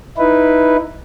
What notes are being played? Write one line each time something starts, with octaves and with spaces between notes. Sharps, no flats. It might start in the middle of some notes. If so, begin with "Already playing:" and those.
D#4 E4 B4